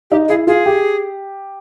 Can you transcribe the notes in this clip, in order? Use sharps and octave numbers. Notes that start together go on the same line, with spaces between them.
D#4 G4
E4 G#4
F4 G#4
G4